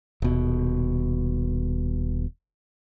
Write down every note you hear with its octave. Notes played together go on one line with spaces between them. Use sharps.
D#1 B2